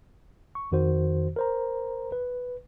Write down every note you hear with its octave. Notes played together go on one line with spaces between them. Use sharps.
C#6
F2 D#3 F#4 C5
A#4 C5 A#5
B4